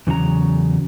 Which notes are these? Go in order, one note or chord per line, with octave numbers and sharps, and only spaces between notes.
E2 C#3 F#3 D4 A#5